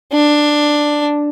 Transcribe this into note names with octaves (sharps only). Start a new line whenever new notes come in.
D4